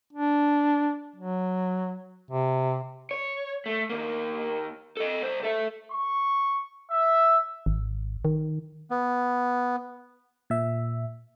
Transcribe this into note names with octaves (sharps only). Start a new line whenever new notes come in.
D4
F#3
C3
C#5
A3
D#2 A#3
A4 D#5
C2 C5
A4 E5
C#6
E5
G#1
D#3
B3
A#2 E5